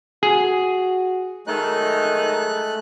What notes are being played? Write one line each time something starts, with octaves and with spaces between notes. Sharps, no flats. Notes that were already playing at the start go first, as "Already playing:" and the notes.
F#4 G#4
D#3 F#3 G#3 A3 D#4 F#6